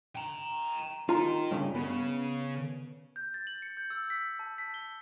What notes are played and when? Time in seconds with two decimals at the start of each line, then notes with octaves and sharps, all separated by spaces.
0.16 G5 A#5
1.09 D#4 F4 A#4 A#5
1.51 G2 C#3
1.75 C#3 B3
3.16 G6
3.34 A6
3.47 F#7
3.62 C#7
3.77 G6
3.90 E6
4.10 B6
4.39 A5
4.58 B6
4.74 G7